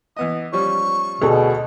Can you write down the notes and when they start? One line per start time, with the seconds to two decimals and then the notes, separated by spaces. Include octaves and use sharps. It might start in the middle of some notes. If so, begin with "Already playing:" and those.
0.17 E3 B3 D#5 D#6
0.53 F3 G3 C#4 C#6
1.21 D2 B2 G#4 A4